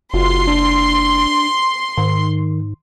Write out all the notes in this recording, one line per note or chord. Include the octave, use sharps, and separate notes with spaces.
F#1 F4 F#4 C6
D4
G#2 D#3